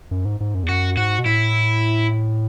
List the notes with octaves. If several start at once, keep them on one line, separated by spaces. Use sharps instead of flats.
F#2
G#2
G#2
F#2
E2
F#2 F#4
G#2 F#4
B2
A2 E4